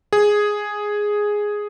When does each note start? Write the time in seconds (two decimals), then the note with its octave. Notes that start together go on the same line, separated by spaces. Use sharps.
0.13 G#4